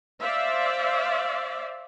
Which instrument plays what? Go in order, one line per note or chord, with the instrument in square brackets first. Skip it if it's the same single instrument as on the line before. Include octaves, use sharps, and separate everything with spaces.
[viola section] C5 D5 E5 F5